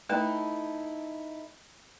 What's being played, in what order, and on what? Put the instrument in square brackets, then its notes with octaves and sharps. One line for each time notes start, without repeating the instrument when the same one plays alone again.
[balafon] A3 B4 G5 [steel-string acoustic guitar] D#4 E4 A4